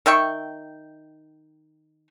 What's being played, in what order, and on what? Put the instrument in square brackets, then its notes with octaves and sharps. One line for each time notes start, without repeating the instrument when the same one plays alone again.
[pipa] D#3 E5 G5 C#6